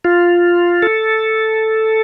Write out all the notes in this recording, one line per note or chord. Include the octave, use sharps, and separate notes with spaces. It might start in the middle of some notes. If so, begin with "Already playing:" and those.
F4
A4